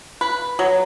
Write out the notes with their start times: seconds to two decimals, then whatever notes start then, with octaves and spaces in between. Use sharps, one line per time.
0.21 B4
0.59 F#3